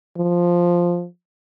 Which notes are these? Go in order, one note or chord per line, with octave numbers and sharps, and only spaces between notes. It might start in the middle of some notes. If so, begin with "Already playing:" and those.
F3